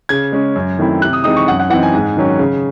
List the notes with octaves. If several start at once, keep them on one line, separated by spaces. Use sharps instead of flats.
C#3 G#6
G#3 C#4
F#2
D#3 A3 C4 E4
C3 F#6
D#6
E3 G#3 C4 D#4 D#6
C#6
F#2 F#5
F#5
E3 C4 D#4 F#5
G#5
G#2
D#3 F#3 C#4
C#3